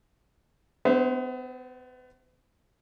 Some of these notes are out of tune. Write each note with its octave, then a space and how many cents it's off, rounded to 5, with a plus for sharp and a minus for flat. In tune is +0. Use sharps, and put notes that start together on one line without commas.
B3 +35 C5 +0 E5 +0